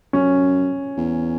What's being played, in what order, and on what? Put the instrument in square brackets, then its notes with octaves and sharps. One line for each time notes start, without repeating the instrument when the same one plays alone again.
[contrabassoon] F#2 [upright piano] C#4
[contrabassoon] E2